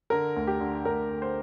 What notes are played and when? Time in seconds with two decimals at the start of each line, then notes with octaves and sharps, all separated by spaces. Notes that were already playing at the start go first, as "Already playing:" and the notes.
0.10 D3 A#4
0.36 D2
0.47 G4
0.60 D3
0.85 D2 A#4
1.10 D3
1.22 C5